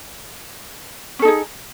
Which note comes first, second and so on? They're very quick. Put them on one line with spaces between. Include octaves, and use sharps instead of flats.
C#4 A4 D#4 G#4